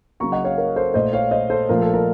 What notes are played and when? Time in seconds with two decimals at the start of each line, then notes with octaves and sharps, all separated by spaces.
0.20 C#3 F#3 A#3 A#5 C#6
0.32 D#5 F#5
0.45 C#5 F5
0.58 A#4
0.76 A4 C5
0.94 A#2 A3 C5 D#5
1.13 C#5 F5
1.31 C5 D#5
1.50 A4 C5
1.69 A#2 F3 A3 A#4
1.82 A4
1.94 A#4